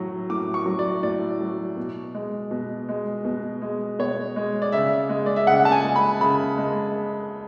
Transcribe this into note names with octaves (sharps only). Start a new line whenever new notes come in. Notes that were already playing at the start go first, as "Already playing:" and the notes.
Already playing: A2 F#3
A2 D6
C#6
F#3
D5
A2 D5
F#3
B2
G#3
B2
G#3
B2
G#3
B2 C#5
G#3
D5
C#3 E5
G#3
D5
E5
C#3 F#5
A5
G#5
G#3
B5
C#3 B5
G#3